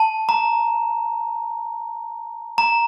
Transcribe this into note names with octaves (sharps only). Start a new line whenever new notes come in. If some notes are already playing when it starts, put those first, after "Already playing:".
Already playing: A5
A#5
A#5